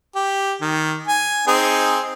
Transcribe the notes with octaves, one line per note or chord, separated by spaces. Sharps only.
G4
D#3
G#5
C4 D#4 G#4